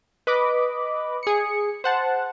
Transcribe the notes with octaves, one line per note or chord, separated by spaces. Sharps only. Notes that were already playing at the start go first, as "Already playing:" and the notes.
B4 D#5 B5 D6
G#4 C#7
C5 F#5 A5